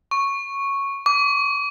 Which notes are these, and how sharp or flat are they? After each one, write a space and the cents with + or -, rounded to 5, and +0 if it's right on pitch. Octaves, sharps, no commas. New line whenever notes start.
C#6 -5
D6 -35